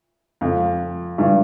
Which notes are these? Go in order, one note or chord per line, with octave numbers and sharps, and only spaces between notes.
F2
G2